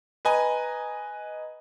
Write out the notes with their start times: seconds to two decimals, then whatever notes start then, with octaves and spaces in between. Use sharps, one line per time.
0.25 B4 D#5 G#5 A#5